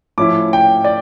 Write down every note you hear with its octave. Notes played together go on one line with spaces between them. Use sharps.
A2 F3 C#4 E4 D6
G5
D5